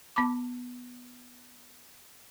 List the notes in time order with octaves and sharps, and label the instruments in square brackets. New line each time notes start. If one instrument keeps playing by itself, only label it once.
[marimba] B3 A5 B5 D6